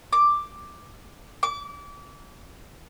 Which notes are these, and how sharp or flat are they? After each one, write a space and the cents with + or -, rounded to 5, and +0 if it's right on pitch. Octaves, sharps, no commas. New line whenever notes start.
D6 +5
D6 -30